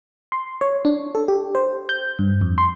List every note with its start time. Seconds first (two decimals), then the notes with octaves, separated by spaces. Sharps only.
0.32 C6
0.61 C#5
0.85 D4
1.15 A4
1.28 G4
1.55 C5
1.89 G6
2.19 G2
2.41 F2
2.58 C6